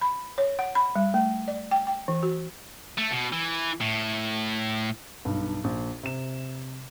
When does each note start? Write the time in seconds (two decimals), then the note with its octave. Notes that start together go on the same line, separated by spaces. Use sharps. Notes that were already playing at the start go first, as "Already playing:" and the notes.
0.01 B5
0.38 C#5
0.59 F#5
0.75 B5
0.96 G3
1.14 A3
1.48 D5
1.71 G5
1.87 G5
2.08 E3
2.23 F#4
2.98 A3
3.12 B2
3.33 E3
3.81 A2
5.25 B1 G2
5.64 A#1
6.03 C3 E7